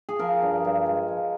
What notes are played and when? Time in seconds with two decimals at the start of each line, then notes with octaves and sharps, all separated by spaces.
0.09 G#4
0.19 F3 A#4
0.42 G2
0.64 G2
0.86 G#3
1.08 F3